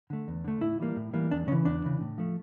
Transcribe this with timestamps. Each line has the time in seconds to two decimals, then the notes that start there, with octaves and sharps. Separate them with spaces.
0.10 D3 A3
0.28 E2
0.44 D3 A3
0.61 A2 E4
0.80 E3 G3 A#3
0.97 A2
1.14 E3 G3 A#3
1.31 E2 D4
1.48 C#3 C#4
1.52 E3
1.65 E2 D4
1.84 C#3 E3
2.01 A2
2.18 F3 A3